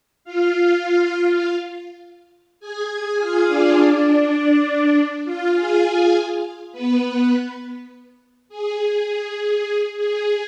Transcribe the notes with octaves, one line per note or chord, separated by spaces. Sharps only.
F4 F5
G#4 G#5
F4 F5
D4 D5
D4 D5
F4 F5
G#4 G#5
B3 B4
G#4
G#4
G#4